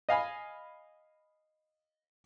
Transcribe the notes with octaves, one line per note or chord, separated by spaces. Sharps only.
D#5 F5 G#5 B5